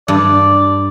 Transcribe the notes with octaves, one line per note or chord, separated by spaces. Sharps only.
G2 D5